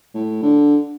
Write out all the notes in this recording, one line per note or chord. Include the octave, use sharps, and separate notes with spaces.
A2
D3